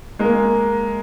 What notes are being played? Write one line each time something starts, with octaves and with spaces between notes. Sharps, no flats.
G#3 A#3